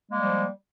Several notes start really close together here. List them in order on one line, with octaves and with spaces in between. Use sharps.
A#3 G#3 G3 F3